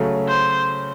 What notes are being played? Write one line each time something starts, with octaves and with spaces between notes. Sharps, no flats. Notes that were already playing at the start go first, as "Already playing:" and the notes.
Already playing: C#3 F#3 A3
C5